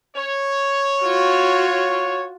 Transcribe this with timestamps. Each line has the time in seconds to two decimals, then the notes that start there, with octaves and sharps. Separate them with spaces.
0.15 C#5
1.04 F4 F#4